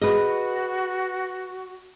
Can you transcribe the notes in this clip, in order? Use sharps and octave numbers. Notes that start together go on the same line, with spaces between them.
F#4 G#4 B4 D#5